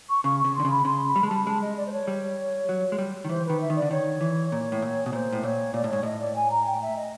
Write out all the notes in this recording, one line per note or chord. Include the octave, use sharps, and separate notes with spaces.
C#6
C#3 C#6
C#6
C#3
C6
D3
C#3
B5
C#3 C6
B5
G3
G#3
G3 A5
G#3 A5
D#5
D5
C5
C#5
G3
F#3
G#3
G3
D#3
E3 C5
D#3 B4
E5
D#3
D5
D3
D#3 C#5
E3
A#2
A2
A#2
B2
A#2 C5
A2
A#2 C#5
A#2 D5
A2
G#2 C#5
A2 D#5
D5
G#5
A#5
G5
E5
D#5